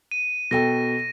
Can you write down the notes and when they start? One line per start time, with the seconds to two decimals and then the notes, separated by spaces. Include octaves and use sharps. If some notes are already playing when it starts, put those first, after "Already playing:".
0.11 D#7
0.51 B2 A4 G5 A#6